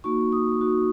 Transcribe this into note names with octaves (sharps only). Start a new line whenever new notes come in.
A#3 D#4 F#4 C#6
D#6
A#3 D#4 F#4